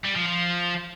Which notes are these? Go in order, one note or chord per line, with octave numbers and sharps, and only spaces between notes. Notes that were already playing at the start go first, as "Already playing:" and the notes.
G3
F3
F3